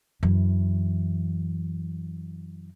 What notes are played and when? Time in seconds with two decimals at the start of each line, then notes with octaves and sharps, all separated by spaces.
0.23 F#2 E3